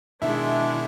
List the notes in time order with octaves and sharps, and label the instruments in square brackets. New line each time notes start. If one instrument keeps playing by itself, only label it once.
[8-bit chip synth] B2 D#3 E4 [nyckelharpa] G#3 D4 [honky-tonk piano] E5